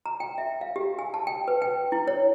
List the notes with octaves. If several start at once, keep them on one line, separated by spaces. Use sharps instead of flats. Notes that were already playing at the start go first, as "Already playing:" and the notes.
A#5
G5
E5
F5
G4
G#5
A5
G5
B4
G5
E4
C#5